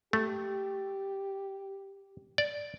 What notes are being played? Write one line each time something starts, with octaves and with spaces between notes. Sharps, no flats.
A3 G4
D5